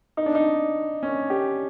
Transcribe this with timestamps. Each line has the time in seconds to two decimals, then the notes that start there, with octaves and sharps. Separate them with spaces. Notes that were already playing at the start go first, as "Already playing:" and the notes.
0.17 D#4
0.26 D4
0.35 D#4
1.03 C#4
1.30 G4